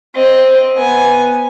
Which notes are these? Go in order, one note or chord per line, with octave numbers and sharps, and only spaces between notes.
C4 D#5
B3 G#5